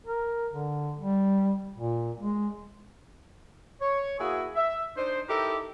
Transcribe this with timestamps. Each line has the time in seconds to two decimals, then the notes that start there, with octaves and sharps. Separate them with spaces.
0.06 A#4
0.53 D3
1.00 G3
1.78 A#2
2.20 G#3
3.81 C#5
4.19 A#3 E4 F#4 G#4
4.55 E5
4.96 D4 D#4 C5
5.29 D#4 E4 G4 A4 A#4